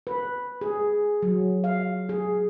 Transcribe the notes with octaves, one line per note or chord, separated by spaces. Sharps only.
B4
G#4
F#3
F5
G#4